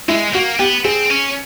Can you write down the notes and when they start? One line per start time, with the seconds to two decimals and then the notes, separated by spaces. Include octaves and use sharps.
0.08 G#3 E4
0.34 A#3 F#4
0.59 B3 G4
0.85 C4 G#4
1.10 C#4